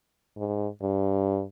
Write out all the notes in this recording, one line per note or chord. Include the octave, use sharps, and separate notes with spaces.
G#2
G2